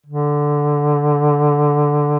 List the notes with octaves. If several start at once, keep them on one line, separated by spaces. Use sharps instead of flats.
D3